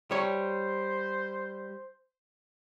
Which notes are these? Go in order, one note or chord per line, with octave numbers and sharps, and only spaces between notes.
G3 C5 C#5